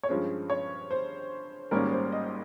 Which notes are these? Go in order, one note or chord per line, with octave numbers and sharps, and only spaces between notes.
C#5
G2 F3 G#3 C#4 C5
C#5
C5
G#1 G#2 G3 A#3 C#4 A#4
C5
D#5